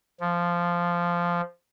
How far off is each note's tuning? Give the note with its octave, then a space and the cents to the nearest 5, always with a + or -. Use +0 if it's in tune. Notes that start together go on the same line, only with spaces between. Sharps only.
F3 -10